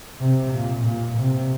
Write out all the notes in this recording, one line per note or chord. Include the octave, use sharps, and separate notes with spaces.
C3
A#2
A#2
C3